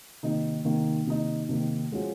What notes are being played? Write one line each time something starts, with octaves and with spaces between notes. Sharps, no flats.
C3 D#3 A#3 D#4
C3 D#3 A#3 D#4
C3 D#3 A#3 D#4
C3 D#3 A#3 D#4
F3 G#3 C#4 F#4